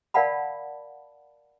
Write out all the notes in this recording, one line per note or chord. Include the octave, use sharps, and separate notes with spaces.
A#4 D5 F5 F#5 A5 B5